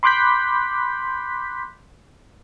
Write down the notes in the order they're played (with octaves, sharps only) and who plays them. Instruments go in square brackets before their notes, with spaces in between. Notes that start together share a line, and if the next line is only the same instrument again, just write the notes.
[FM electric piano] B5 C6 D6 F#6 G6 B6